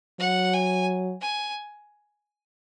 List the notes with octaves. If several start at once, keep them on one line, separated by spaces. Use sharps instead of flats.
F#3 F#5
G#5
G#5